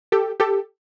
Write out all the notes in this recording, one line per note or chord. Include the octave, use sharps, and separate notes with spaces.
G4 A4
G4 A4